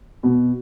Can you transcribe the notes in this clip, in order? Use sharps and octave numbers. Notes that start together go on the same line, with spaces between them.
B2